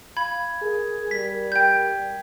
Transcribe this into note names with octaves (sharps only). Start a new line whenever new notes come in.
F5 B5 G#6
G#4 A#4
G3 B6
G5 G6